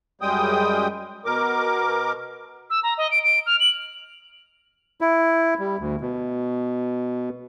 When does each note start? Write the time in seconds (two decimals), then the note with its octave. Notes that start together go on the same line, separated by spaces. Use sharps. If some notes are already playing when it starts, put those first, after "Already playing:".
0.21 F#2 G3 G#3 G5 D#6
1.25 B2 A#4 D6
2.70 E6
2.83 A#5
2.97 D#5
3.11 D7
3.23 D7
3.46 F6
3.60 F#7
5.01 E4
5.59 G3
5.79 D2
6.01 B2